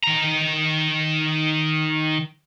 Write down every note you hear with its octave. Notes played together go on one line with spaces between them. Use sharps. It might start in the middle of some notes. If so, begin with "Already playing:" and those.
D#3 A#5